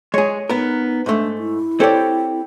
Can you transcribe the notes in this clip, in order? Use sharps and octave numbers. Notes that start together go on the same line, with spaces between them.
G#3 G#4 C#5
B3 D#4 A#4
G#2 A3 D4
E4
C4 G4 A4 C#5 D5